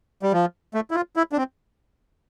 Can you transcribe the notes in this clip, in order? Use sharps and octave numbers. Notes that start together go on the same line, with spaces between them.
G3
F3
A3
E4
F4
E4
D4
C4